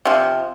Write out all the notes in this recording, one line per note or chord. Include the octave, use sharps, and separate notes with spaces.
C3 F3